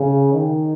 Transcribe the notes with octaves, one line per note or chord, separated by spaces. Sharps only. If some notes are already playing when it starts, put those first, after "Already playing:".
Already playing: C#3
D#3